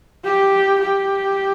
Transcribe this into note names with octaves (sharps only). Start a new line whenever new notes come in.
G4
G4